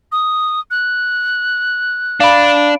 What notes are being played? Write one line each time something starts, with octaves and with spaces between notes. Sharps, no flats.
D#6
F#6
D4 F5 B5